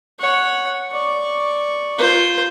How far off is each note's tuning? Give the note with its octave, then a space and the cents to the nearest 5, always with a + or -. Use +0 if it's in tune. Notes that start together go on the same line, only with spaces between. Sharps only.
C#5 +0 F#5 -10
D5 +0 C#6 +0
F4 +0 C5 +0